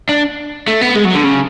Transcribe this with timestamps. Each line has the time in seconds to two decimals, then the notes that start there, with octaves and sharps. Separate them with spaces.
0.09 D4
0.67 A3
0.81 B3
0.96 G#3
1.05 F#3
1.16 D3
1.25 C#3